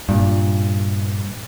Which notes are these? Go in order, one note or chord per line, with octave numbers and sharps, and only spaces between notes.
G2 A#2